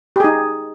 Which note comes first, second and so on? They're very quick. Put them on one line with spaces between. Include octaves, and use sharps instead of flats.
G4 G#4 D#4